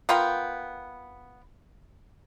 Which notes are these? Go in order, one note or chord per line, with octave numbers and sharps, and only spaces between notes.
B3 F4 A#4 G5